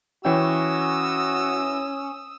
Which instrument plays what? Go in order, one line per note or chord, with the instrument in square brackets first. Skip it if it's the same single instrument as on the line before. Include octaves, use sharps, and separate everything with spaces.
[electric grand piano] E3 G5 [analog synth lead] C#4 [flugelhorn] F#4 [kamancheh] D#6 E6